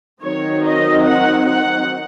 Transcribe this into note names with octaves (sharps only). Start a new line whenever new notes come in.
D#3 F#3 C4 D#4 C#5
D#5
F#5
F#5